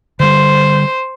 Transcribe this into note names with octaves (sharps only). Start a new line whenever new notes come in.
D3 G3 C5